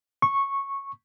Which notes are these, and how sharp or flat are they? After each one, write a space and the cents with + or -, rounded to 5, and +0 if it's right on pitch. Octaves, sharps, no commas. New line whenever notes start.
C#6 -10